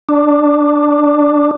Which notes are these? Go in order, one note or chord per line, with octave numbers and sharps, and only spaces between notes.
D4